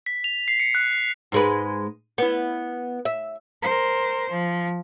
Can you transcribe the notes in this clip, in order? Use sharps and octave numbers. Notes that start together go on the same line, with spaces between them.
B6
F7
C7
C#7
F#6
C7
G#2 G#3 B4
B3 E4
E5
A#4 C5
F3